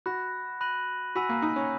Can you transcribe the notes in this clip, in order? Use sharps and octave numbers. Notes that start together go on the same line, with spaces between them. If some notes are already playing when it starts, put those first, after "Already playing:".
F#4 B5 F#6 A#6
B5 F#6 A#6 D#7 F#7
F#4 G#5 B5 E6 B6 D#7
A#3
D#4
C#4